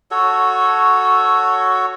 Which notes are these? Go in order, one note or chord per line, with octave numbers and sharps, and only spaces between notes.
F#4 A4 C#5